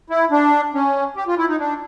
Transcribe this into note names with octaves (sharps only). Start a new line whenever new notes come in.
E4
D4
C#4
G4
F4
E4
D#4
D4